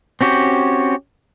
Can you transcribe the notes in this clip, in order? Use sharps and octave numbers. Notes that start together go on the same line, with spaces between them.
C4 C#4 F#4 G4